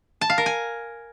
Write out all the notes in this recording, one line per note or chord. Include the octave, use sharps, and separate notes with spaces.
A5
F5
A#4
G#5